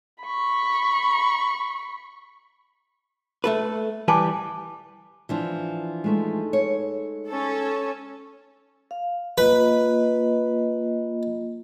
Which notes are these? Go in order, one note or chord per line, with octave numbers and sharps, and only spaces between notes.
B5 C#6
A3 A4 B4
E3 G3 B4 G#5 A5 D6
E3 F3 D4
G#3 A3 D#4
C#5
C#4 A4
F5
A#3 F4 B4 D#5